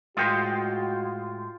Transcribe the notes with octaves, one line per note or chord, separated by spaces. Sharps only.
A2 G#3 F4 F#4 G5 C6